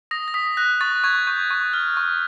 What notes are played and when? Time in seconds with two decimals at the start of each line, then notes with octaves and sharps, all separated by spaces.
0.11 D#6 A#6
0.28 A#6
0.34 D#6 B6
0.57 F#6 A#6
0.81 C#6 A6
1.04 C#6 G#6
1.27 C#6 G6
1.50 C#6
1.73 F6
1.97 C#6